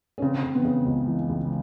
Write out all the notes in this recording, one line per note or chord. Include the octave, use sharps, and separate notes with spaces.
C#4
C#3 C4
C#3
B3
C#3
C#2
E3
C#2